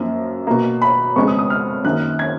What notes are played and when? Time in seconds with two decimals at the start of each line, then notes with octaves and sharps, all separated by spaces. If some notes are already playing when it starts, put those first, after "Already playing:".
Already playing: F#2 F3 A#3
0.47 B2 A#3
0.82 B5
1.16 F2 C#3 G#3 B3 C#6
1.27 D#6
1.38 D#6
1.50 F6
1.84 F#2 D#3 A#3 F#6
2.19 G#6